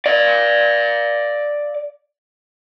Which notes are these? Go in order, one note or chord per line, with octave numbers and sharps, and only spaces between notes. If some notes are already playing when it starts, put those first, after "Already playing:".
D5 F5